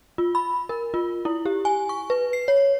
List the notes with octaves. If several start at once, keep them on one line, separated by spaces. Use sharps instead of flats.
F4
B5
A#4
F4
E4
G4
G#5
C#6
B4
C7
C#5